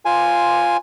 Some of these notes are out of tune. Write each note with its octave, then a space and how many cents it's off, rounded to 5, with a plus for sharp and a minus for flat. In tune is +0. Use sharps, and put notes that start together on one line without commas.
F4 +0 C5 -5 G#5 +0